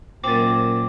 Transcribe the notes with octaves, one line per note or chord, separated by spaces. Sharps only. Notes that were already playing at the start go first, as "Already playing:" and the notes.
F#2 A#2 C4 D6 A6